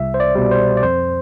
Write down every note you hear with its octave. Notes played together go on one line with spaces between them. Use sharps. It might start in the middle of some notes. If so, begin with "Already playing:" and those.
Already playing: C2 E5
C5
D5
B2 G3
C5
D5
F2 C5